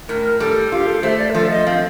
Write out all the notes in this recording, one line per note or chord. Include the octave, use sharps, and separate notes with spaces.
A2 A#4
G3 A4
F4 G4
A4
A3 C5
D5
A#4
F3 A4
D#5
C4 F5